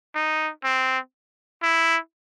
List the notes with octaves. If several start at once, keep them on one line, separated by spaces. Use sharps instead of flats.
D#4
C4
E4